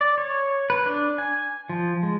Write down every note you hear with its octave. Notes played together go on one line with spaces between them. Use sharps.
D5
C#5
B4
D4
G#5
F3
G#3